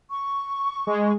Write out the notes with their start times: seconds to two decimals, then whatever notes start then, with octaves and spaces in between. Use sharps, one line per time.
0.11 C#6
0.87 G#3